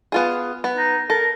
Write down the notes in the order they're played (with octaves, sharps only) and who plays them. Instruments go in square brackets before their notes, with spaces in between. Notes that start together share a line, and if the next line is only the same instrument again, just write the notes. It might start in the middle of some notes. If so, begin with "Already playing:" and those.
[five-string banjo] B3 F4 G#4
B3
[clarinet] D#4
[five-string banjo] A4 [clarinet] A#4